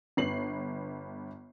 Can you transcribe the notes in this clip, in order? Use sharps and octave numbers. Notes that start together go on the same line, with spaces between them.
G1 B3 C7 F#7